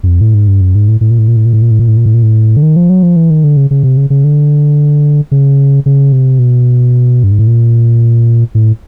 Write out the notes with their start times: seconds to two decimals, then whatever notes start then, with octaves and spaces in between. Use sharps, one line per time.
0.03 F#2
0.07 F2
0.21 A2
0.34 G#2
0.48 G2
0.61 F#2
0.75 G#2
0.88 A2
1.01 A2
1.11 A#2
1.19 A2
1.28 A#2
1.36 A2
1.45 A#2
1.53 A2
1.62 A#2
1.71 A2
1.79 A#2
1.88 A2
1.97 A#2
2.06 A2
2.14 A#2
2.23 A2
2.57 D3
2.62 D#3
2.76 F3
2.90 F#3
3.03 F3
3.16 E3
3.30 D#3
3.44 D3
3.57 C#3
3.71 C#3
3.83 C3
3.97 C#3
4.10 C#3
4.24 D3
5.31 C#3
5.86 C#3
6.12 C3
6.39 B2
7.24 G2
7.32 G#2
7.39 A2
7.47 A#2
8.55 A2